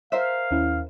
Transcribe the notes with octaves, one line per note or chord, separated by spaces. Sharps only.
A#4 C5 E5 F5
D#2 C#4 E4